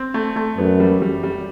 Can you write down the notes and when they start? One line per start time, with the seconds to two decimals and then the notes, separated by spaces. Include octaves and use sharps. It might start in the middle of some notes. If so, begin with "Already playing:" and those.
Already playing: C4
0.14 A3
0.36 A3
0.58 F#2 B3
0.80 G3
1.02 G3
1.23 G3